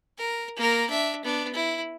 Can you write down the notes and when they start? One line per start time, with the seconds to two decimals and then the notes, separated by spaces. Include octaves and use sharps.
0.18 A#4
0.57 A#3 A#4
0.90 D4 E5
1.24 B3 D4
1.54 E4